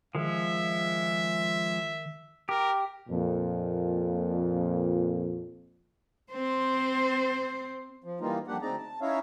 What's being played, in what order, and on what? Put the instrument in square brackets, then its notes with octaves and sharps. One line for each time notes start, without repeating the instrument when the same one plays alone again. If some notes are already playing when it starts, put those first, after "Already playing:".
[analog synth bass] D#3 [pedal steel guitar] F3 G#3 [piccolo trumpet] E5
[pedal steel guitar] G4 [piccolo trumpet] A#4
[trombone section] F2 A#2
[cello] C4 C5
[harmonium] F3
E3 G3 A#3 D#4 F4
F2 G3 A#3 D4 G4 F#5
D2 C4 D#4 G#4 D5 A#5
A5
C#4 D#4 E4 C#5 E5 F5